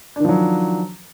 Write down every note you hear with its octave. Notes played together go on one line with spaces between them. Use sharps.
D#3 F3 F#3 D4